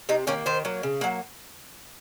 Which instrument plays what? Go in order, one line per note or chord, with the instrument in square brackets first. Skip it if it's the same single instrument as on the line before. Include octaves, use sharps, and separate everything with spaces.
[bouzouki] C3 D#4
D#3 A#3 C#4
D#3 C5
F#3 A#3
C#3
F#3 A#3 F#5